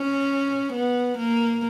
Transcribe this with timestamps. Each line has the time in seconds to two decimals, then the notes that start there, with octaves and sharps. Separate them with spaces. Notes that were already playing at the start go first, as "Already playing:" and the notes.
Already playing: C#4
0.73 B3
1.18 A#3